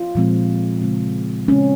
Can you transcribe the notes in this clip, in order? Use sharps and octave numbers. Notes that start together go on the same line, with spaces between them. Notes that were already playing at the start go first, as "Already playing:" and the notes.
Already playing: F4
A#2 F3 G#3 C4
C#3 G#3 C4
C#3 G#3 C4 C#4